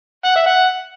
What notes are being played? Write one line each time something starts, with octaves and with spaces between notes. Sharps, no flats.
F#5
E5
F#5